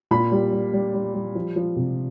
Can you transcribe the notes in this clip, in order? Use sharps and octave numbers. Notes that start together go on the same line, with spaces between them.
A#2 B5
G3
G3
G3
G3
G3
F3
F3
C3